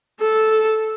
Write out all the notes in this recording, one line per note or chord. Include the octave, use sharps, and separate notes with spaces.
A4